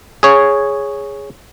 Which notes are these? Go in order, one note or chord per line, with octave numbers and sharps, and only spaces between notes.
G#4 C#5